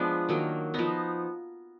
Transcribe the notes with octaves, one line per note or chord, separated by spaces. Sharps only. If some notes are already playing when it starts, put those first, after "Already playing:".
Already playing: F3 G#3 B3 D4
D#3 F#3 A#3
F3 B3 D#4